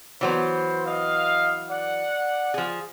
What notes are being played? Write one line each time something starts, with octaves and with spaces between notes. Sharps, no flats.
E3 F#3 B3 C5
D#5 F5
D5 F#5
F3 G#4